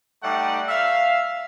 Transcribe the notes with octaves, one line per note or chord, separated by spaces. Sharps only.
G3 A3 D#4 D5 F#5
E5 F5